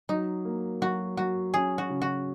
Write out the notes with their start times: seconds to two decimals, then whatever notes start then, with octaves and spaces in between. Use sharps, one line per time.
0.09 F#3 D#4
0.45 A#3
0.81 F#3 F#4
1.17 F#3 F#4
1.54 C#4 G#4
1.78 F#4
1.90 C#3
2.02 F#4